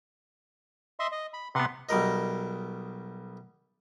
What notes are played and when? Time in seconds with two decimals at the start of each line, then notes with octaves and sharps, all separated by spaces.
1.00 D#5 E5 C6
1.12 D#5
1.34 B5
1.55 C3 B3 B4 F#5 C6
1.89 B1 G3 A#4 D#5